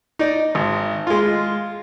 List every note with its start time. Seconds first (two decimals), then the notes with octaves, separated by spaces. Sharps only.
0.19 D#4 D5
0.55 G#1
1.07 G#3 F4